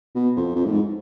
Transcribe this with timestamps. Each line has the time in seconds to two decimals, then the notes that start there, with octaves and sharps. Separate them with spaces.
0.15 B2
0.37 F2
0.56 F2
0.65 A2
0.71 G#2